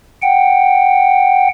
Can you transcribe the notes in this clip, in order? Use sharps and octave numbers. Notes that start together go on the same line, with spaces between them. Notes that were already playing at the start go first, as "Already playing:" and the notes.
F#5 G5